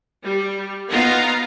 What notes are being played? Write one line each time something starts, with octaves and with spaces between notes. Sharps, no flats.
G3
B3 D#4 F4 F5 A#5